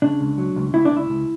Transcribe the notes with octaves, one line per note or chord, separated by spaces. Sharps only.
C#3 D4
C#2
F#3
C#2
C#2 E4
D4
C#2 E4
C#2